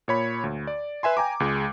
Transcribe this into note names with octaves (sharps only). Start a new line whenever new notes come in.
A#2 C#5 B5
D2
D5
B4 E5 G#5 C6
G5 G#5 A#5 D6
C#2 G#3